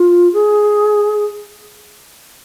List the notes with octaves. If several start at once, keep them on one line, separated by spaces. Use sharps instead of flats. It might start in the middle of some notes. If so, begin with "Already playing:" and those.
Already playing: F4
G#4